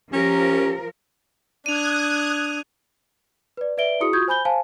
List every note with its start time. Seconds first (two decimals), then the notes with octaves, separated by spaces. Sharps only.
0.13 F3 C#4 G4 A#4
1.66 D4 D#6 F#6 G#6 D#7 F7
3.57 B4 D5
3.77 B4 D5 E5 D7 G7
4.00 E4 F#4 G#4 D#6 C#7
4.13 F4 F#4 C#6 D#6 G6 G#6
4.28 C5 G#5 B5 G6 G7
4.45 C5 F5 G#5 A5